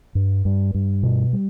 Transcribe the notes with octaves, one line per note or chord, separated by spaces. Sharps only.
G2
G2
G2
B2
G3